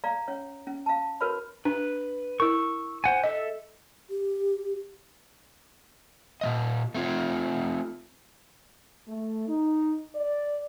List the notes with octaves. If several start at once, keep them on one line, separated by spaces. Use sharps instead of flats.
D5 F5 A#5
C#4 C#5
C#4
F5 A5
F#4 A#4 B4 C#5 B5
D4 B4
E4 A#4 C#6 E6
C5 F#5 G#5
A4 D#5 E5
G4
A#2 G3 D#5
A3 C4 F4
A3
D#4
D5